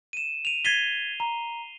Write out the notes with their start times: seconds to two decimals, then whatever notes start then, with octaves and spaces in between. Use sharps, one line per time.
0.13 D#7 E7
0.45 D#7 F7
0.65 G#6 A6 B6 C7 D#7 G7
1.20 A#5